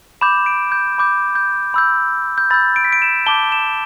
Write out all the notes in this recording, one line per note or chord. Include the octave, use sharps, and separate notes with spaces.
B5 D6 G6 E7
D7
G6
B5 D6 G6
G6
B5 E6 G6
G6
B5 E6 G6 A6
D7
B6
D7
E7
A5 D6 G6 G7
E7